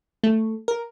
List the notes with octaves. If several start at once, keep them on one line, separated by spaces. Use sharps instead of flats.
A3
A#4